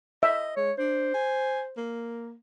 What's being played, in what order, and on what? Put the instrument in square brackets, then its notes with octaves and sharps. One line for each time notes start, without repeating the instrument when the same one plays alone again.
[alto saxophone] D#5 [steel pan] E5
[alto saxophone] G#3 [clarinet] C#5
[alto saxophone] D4 [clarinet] C5
[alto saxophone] G#5
A#3